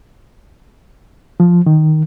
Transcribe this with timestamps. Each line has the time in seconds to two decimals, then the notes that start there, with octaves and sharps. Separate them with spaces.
1.40 F3
1.66 D#3